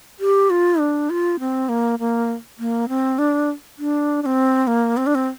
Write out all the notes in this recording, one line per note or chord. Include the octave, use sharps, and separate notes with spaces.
G4
F4
D4
F4
C4
A#3
A#3
A#3
C4
D4
D4
D4
C4
A#3
C4
D4
C4